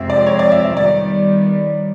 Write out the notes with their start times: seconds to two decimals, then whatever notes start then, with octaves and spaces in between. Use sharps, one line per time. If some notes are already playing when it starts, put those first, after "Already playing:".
Already playing: F2 C3 F3 G#3 C4 E5
0.10 D5
0.26 C#5
0.39 D5
0.52 E5
0.64 E5
0.76 D#3 G3 B3 D5